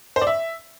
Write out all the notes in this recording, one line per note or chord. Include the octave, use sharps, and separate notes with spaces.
C5
D5
E5